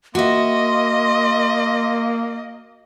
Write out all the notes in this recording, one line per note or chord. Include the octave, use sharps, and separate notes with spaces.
A#3 F#4 D#5 E5 C6